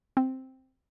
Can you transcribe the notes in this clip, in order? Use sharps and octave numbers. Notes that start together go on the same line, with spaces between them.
C4